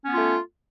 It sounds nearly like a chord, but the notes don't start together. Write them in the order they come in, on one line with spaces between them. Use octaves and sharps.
C#4 B3 F4 A3